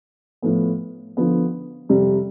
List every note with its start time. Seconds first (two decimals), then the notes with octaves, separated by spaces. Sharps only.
0.42 A2 F3 B3
1.17 D3 F3 B3
1.89 F2 C3 G3